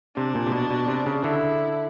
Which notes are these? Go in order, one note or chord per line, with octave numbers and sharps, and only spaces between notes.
C3 D4
A#2
C3
B2
B2
C3
C#3
D3 E4